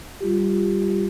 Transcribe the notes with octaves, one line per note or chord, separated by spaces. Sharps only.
G3 F4 G4